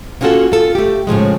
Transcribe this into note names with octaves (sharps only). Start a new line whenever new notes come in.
A#3 B3 C#4 F4 F#4 A4
F4 A4
A3 G4
A2 C#3 F3 G#3